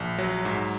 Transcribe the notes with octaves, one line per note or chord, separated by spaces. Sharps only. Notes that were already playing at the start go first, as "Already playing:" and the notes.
Already playing: A#1
F#3
G#2